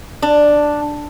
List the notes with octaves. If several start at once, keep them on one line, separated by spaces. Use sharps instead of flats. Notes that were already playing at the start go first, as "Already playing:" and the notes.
D4